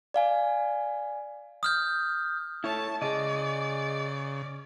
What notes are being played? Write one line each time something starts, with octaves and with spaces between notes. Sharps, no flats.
D5 F5 G#5
D#6 F6 G6
A3 E4 C#5 A5 C#6
C#3 G#4 D5 D#5